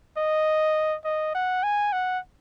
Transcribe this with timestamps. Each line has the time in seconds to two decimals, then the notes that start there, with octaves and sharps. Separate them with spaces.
0.17 D#5
1.04 D#5
1.35 F#5
1.63 G#5
1.92 F#5